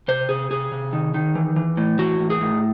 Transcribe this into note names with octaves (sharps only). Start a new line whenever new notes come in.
C3 C5
C3 G#4
C3 G#4
C3
D#3
D#3
E3
E3
A2
E3 F#4
A2
G#4
A2